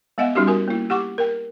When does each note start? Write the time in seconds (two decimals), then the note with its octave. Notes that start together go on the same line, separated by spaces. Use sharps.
0.18 G#3 B3 D#5 E5 F#5
0.35 G3 C#4 D#4 F#4 G4
0.47 F#4 A#4 G#5
0.68 A#3 E4
0.90 G4 F#5 C#6 D6
1.18 A#4 G5